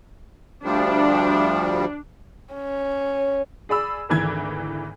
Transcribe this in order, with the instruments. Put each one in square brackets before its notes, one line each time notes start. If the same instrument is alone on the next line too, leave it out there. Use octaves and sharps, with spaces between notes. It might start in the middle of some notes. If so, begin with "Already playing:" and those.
[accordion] D2 F3 G3 [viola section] D4
[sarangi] C#4
[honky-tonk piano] G#4 D5 B5 E6
G#1 D2 E3 G#6